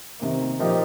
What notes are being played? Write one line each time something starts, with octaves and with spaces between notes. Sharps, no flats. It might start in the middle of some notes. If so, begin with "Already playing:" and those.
C3 D#3 A#3
A#2 F3 A#3 D#4 G4